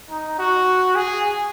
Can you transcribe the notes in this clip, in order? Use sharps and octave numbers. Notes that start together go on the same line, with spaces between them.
D#4
F#4
G#4